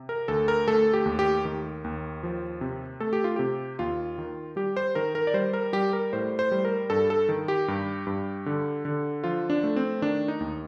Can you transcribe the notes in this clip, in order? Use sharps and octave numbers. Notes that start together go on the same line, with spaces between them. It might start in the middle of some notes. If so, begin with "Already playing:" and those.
Already playing: C3
A#4
D2 A4
A#4
A3 A4
G4
D#2
G4
D#3
D#2
F3
C3
A3 A4
G4
F4
C3 G4
D#2 F4
D#3
G3 G4
C5
D#3 A#4
A#4
D5
G3 C5
A#4
G3 G4
A#4
A2 C5
C5
G3
A#4
G2 A4
A4
D#3
G4
G2
G2
D3
D3
F3 F4
D4
A3
C4
D#3 D4
D#4
D#2